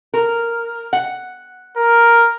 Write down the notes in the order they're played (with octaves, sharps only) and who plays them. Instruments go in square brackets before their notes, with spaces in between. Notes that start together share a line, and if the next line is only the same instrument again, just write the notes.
[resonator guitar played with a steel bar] A#4
F#5
[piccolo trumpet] A#4